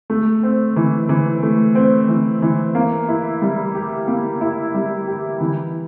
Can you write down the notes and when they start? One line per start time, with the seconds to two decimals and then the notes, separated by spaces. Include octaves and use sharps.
0.10 A3
0.43 C4
0.76 E3
1.09 E3
1.43 A3
1.75 C4
2.09 E3
2.42 E3
2.75 A#3
3.08 E4
3.42 G3
3.75 G4
4.08 A#3
4.41 E4
4.74 G3
5.07 G4
5.41 E3